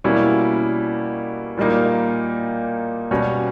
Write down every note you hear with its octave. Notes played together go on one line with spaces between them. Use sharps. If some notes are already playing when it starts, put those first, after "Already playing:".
B2 G3 A#3 C#4 E4
A#2 G3 A#3 D#4
B2 G3 C#4